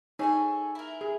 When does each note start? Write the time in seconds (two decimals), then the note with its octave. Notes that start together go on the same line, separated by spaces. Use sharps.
0.19 D#4 G#4 A4 C#5 G#5
0.75 E4 A#4
1.01 G#4